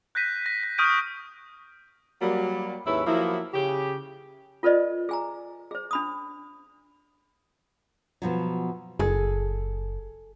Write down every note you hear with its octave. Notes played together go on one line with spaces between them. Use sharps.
F#6 G6 A#6 B6 D#7
A#6
A#6
C#6 D#6 F6 G6 D7 D#7
F#3 G3 A#3
D#2 G#2 C#4 E4 B4 E5
F3 F#3 A#3 B3 E4
C#3 G4
F4 A4 B4 C5 D5 D#5
G#4 G#5 A#5
G#4 C5
D4 B5 D#6
B2 F3 F#3
F#1 G#4 A4